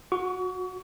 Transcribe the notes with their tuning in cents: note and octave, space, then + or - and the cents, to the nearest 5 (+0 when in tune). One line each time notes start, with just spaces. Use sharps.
F#4 -15 C#6 +35